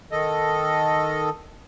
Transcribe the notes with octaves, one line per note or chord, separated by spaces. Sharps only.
D#3 A4 D#5